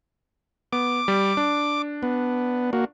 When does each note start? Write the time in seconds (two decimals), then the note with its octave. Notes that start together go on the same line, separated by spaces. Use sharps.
0.72 B3 D6
1.08 G3
1.37 D4
2.03 B3
2.73 A#3 F#4